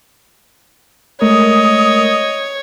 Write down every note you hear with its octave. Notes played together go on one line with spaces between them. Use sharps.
G#3 A3 A#4 C#5 D#5 D#6